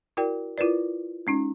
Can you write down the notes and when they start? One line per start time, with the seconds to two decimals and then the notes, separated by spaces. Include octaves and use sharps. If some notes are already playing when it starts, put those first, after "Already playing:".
0.17 E4 F#4 A#4 D5 G5
0.58 E4 F4 A#4 B4 D5
1.27 G#3 C#4 D#4